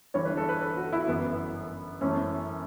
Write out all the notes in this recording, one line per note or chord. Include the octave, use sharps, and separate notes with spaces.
G1 G2 E3 C#5
B4
A4
B4
A4
F#4
E4
G1 F#2 E3 B3
F#2 E3 A3 C#4